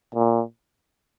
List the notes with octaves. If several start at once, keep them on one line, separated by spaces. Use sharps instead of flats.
A#2